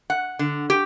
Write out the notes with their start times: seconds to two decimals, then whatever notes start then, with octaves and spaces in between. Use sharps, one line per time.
0.10 F#5
0.39 D3
0.70 G4